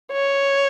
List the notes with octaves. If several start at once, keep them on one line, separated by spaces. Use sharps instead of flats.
C#5